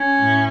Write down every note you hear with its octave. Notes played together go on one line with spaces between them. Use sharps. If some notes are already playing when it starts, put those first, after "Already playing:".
Already playing: C#4
A2